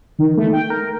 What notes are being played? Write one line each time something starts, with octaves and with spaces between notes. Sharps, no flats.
D#3
A3
G5
A#4